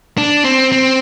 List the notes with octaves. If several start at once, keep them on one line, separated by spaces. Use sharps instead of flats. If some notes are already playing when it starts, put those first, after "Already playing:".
D4
C4
C4